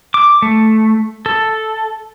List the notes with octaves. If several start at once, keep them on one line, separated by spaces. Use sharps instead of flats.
D6
A3
A4